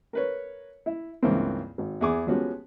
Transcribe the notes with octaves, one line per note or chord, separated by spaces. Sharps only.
A#4 B4 C#5
E4
C#2 G2 E3 A#3 C4
G#1
E2 G#4 D6
F3 G#3 B3 C#4 F#4 G4